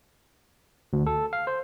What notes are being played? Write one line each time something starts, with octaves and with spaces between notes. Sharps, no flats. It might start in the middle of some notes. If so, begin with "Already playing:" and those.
D2
A4
F5
C5